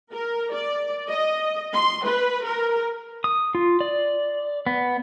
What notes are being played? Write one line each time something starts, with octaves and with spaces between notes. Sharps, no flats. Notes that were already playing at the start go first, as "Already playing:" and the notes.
A#4
D5
D#5
C6
B4
A#4
D#6
F4
D5
B3